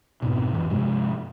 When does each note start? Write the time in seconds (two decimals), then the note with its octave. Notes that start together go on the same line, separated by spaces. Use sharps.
0.22 F2 G#2 B2
0.53 F#2 E3
0.70 G2 C3 F3 G#3